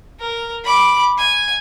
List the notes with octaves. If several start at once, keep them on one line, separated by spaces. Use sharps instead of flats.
A#4
B5 D6
G#5